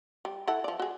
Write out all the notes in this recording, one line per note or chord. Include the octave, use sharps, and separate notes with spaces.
G3
E4 A4 F#5
F3 D5
F#4 G#4